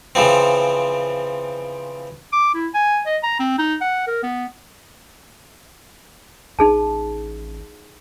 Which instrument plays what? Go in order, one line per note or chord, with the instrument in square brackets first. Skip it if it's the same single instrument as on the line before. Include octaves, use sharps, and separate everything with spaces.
[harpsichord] C#3 E3 F3 C4
[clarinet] D6
E4
G#5
D#5
A#5
C4
D#4
F#5
A#4
B3
[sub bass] A1 [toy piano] D#4 G#4 A5